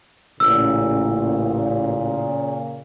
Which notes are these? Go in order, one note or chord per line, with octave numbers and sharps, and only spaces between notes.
A1 A#2 C#3 E6